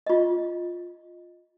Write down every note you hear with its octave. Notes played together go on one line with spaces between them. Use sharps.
F4 D#5